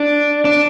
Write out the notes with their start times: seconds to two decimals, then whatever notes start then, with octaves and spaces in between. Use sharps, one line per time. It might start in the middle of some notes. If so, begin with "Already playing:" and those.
Already playing: D4
0.45 D4